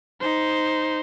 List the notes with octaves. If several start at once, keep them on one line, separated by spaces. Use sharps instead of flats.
D#4 C5